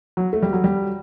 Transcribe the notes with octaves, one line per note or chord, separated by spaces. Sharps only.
F#3
A3
G3
F#3
G3